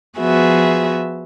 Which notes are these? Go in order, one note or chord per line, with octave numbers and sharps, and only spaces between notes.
F3 B3 F#4 G#4 E5